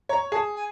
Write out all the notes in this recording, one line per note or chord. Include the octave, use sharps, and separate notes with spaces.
C#5 A#5
G#4 A5
G#5